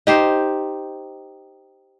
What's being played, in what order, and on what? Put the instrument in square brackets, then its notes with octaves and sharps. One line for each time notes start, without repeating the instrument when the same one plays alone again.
[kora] D#4 G4 C5